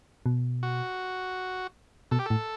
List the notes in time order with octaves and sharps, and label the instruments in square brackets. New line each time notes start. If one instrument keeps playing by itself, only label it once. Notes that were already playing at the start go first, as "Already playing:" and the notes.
[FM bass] B2
[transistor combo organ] F#4
[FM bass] B2 [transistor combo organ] A4
[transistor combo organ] G4
[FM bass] A2 [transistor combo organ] A4